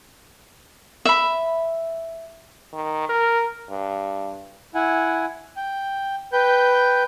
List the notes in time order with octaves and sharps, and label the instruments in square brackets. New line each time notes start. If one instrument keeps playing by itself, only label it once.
[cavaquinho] E5 B5
[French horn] D#3
A#4
G2
[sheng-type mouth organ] E4 F#5 G#5
G5
B4 G5 G6